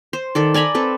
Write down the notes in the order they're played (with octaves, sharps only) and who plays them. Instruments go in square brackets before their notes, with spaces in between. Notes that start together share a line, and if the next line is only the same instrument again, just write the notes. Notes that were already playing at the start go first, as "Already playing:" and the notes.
[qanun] C5
D#3 A4 D5
D5 G#5 A#5 B5
C4 A4 B4